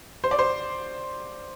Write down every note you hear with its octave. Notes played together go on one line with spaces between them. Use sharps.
C5
D5
C5